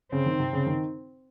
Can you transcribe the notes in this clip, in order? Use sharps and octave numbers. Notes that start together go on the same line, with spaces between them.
C#3 C4
D#3
C3
C#3
D#3